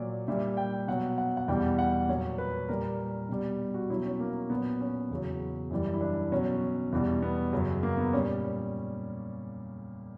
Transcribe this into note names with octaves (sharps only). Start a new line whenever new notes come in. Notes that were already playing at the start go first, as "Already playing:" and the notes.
Already playing: A#2 F#3 D5
A#2 G3 E5
G5
B2 F#3 F#5
F#5
F#5
E2 B2 G3 G5
F#5
A#2 F#3 C#5
B4
A#2 G3 A#4
B2 G3
F#4
B2 F#3 E4
C#4
A#3
A#2 F#3 B3
C#4
E2 C#3 F#3
F#2 E3 G3
E4
D4
B2 F#3 C#4
E2 B2 G3
B3
F#2 C#3 F#3
A#3
B3
A#2 G3 C#4